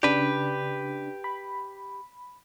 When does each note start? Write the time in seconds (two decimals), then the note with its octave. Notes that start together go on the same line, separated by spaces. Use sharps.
0.03 C#3 D4 G4 B4
1.24 B5